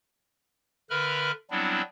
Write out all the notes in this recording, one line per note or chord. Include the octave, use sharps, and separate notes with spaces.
D3 A#4 B4 E5 B5 F6
F#3 G3 B3 C4 D4 E4